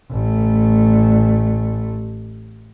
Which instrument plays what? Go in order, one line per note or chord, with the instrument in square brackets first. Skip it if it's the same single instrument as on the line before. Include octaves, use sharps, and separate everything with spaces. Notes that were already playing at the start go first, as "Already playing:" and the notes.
[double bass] A1 A3